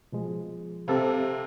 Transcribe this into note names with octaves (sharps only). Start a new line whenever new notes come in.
B2 F3 G#3
C3 C4 A4 F5